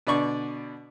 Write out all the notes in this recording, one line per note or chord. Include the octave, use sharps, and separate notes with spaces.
B2 D3 D5 C#6